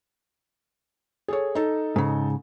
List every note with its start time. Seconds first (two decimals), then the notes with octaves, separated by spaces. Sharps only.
1.28 G#4 A4 C#5
1.55 D#4 A4
1.96 G#2 C#3